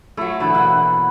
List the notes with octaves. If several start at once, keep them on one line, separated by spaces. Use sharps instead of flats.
F#3 A3 E4 F4 A5
B2 D3 E3 A4 B5
B2 A#3 F#5